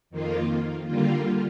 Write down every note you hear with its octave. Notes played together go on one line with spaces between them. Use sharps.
F2 D#3 A#3 F4
D3 G3 A#3 F4